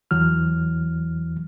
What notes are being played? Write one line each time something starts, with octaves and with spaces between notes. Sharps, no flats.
E2 E3 F#3 F6